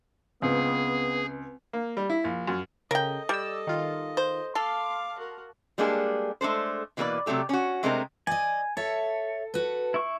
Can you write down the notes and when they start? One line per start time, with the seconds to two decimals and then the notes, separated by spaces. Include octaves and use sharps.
0.42 C#2 B3 C4 G#4 B4
1.73 A#3
1.97 G3
2.10 E4
2.24 A#1
2.47 F#2
2.91 C#3 A4 A#4 D#5 G5
3.29 G3 D5 E6
3.67 D#3 F4
4.17 C5
4.55 A4 F5 C6 D6 F6
5.18 F#4 A#4
5.78 G3 G#3 A#3 D4 G#4 A4
6.41 G#3 A3 D4 A4 C5
6.97 B2 E3 A#3 G#4 B4 D5
7.26 C3 F#3 A3 G4 A4
7.49 C#4 F#4
7.83 C3 G#3 A3 C4 D4 A#4
8.27 D5 D#5 G#5
8.77 A4 C#5 E5
9.54 F#4 B4
9.94 E4 C#6